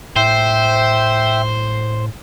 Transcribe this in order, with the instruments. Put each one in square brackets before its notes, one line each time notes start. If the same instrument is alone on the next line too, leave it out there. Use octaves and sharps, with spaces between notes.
[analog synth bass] A2 [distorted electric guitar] C5 [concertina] E5 G5